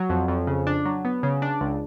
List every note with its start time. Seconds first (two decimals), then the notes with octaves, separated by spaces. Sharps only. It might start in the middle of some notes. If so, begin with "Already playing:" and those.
Already playing: F#3
0.10 F2
0.28 F2
0.47 C#3
0.67 D4
0.86 F#3
1.05 B3
1.23 C#3
1.42 D4
1.61 C#2